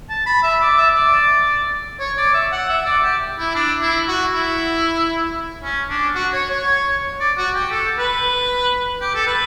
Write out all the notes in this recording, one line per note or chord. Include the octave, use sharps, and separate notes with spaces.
A5
B5
E5
D5
E5
D5
C#5
D5
E5
F#5
E5
D5
G4
E4
D4
E4
F#4
E4
C#4
D4
F#4
C#5
C#5
D5
F#4
G4
A4
B4
G4
A4
B4